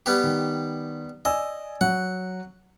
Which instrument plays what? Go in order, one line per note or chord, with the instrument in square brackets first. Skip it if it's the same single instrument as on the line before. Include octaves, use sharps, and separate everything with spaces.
[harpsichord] G3 B3 G4
[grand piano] D#3
[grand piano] D5 G#5 E6 [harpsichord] D#5
[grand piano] F#3 [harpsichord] F#5